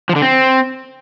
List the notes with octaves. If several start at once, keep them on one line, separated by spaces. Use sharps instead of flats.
F3
D3
C4